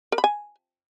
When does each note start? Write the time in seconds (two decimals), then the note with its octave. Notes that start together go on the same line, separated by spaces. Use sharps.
0.12 A#4
0.18 B5
0.24 G#5